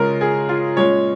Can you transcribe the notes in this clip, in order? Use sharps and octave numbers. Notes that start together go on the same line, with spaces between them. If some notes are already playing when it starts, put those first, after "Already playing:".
Already playing: C#3 G#3 C#4 F4 A#4
G#4
F4
A#2 G#3 C#4 C#5